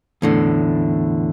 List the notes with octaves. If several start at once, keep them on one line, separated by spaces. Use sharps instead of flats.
E2 A2 D3